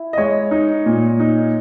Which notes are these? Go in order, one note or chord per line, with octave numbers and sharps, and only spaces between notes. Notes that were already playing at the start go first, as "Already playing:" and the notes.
Already playing: E4
D#5
G#3 C#5
D#4
A#2
D#4